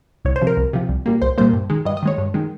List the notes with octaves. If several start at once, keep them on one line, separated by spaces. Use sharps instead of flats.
C2 C#5
C5
C3 F3
A#4
C2
C3 F3
C2
A#2 G3 A#3
C2 C5
A#2 G3 A#3 C5
G2
D#3 G#3
G2 D#5
D#5
D#3 G#3 C#5
G2
D#3 G#3